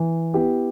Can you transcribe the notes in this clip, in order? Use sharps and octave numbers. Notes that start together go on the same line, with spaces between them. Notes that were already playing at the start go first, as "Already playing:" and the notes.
Already playing: E3
B3 E4 G4